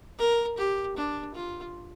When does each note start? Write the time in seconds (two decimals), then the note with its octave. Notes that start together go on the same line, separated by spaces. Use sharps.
0.19 A#4
0.57 G4
0.96 D4
1.34 F4